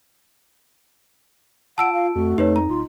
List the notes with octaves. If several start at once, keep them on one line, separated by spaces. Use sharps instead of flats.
F4 F#5 A5 E6 D7
F5
F2 A3 F#4
F2 D#4 G4 B4 C#5
A#5
D1 F4